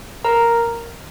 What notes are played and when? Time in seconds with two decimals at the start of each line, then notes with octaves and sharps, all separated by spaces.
0.24 A#4 A#5